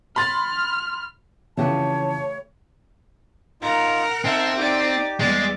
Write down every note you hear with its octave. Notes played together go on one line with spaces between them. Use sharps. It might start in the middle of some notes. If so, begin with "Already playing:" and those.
B5 C6 F6 A6
F2 C#3 E3 A3 G4 B4 C#5 A5
D#4 F4 A#4 F#5 A#5
C4 D#4 E5 A5
D#4 G4 D5
E2 G3 G#3 D5